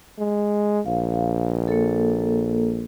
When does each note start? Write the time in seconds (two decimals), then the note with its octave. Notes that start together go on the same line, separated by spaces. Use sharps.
0.19 G#3
0.86 A#1 F5
1.68 A#3 A4